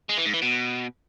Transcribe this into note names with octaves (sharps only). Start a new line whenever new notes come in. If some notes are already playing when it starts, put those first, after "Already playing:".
G#3
E3
G#2
E3
B2